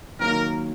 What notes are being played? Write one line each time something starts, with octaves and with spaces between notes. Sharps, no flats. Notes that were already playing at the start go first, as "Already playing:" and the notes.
D#3 F#3 A#3 A#4